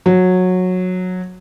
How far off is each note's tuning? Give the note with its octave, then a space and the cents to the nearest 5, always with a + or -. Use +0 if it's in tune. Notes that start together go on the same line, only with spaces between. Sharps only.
F#3 -15